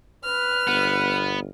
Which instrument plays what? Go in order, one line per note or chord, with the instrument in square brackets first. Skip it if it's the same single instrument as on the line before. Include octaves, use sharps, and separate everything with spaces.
[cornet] B4 [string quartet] F6
[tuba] G1 [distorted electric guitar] B3